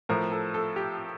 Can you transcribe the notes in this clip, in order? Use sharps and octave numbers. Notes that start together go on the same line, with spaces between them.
A2 F3 A#4
A4
A4
G4